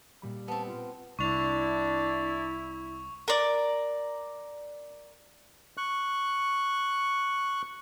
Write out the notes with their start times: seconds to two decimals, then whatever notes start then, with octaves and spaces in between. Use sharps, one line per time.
0.22 A#2 G3 B5
0.48 B3 C4 A5
0.67 F4
1.19 C2 D4 E4 C#6 F7
3.28 A#4 D5
5.77 C#6 F#6